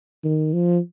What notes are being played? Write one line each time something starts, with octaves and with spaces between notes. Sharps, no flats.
D#3
F3